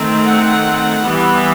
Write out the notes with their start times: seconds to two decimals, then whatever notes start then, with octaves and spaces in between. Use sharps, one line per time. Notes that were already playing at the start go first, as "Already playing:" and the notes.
Already playing: D#3 A3 C4
0.25 F#5
1.02 E3 G3 B3